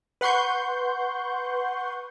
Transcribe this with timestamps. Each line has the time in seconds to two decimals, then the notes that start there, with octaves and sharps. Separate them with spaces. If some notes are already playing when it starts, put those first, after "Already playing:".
0.21 B4 F#5 C6 C#6 G6